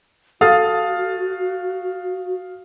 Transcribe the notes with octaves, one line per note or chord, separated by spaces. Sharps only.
F#4 A4 F5 D#6 A6